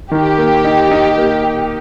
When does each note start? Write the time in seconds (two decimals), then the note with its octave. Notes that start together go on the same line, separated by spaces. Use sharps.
0.11 D#3 G4
0.38 A#3
0.65 D#4
0.91 D#4
1.18 A#3